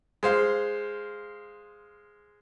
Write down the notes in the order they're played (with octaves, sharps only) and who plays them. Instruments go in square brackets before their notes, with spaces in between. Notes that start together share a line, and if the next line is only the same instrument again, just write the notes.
[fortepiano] G#3 C5 F5